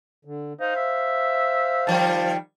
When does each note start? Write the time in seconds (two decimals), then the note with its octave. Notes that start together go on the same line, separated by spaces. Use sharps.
0.25 D3
0.61 D#4 C5 F5
0.76 E5
1.87 D#3 F3 G3 A5